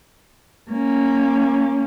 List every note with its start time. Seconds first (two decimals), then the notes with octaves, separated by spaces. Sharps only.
0.71 A#3 C#4